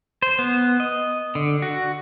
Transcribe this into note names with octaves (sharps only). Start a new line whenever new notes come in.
C5
B3
D#5
D3
F#4